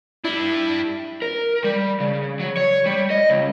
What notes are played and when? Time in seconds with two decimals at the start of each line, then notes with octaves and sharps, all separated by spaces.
0.24 G3 D4 E4
1.22 A#4
1.64 G3
2.00 C#3
2.40 F#3
2.57 C#5
2.86 G3
3.10 D#5
3.30 C#2